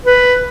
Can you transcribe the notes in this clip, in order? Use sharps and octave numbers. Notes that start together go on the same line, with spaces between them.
B4